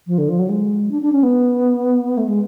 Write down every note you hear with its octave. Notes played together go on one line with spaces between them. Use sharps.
F3
D3
F3
F#3
G#3
D4
D4
C#4
B3
A3
G#3